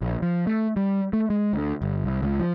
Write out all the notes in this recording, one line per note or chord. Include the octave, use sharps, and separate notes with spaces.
A#1
F3
A3
G3
A3
G#3
D2
G1
C2
C#2
F3